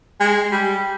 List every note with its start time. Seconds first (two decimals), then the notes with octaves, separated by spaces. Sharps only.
0.20 G#3
0.52 G3